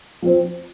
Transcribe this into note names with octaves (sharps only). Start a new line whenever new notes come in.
F3 C4